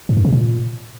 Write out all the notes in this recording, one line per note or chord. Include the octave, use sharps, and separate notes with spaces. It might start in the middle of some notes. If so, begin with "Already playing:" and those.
G#2
F#2
C3
A#2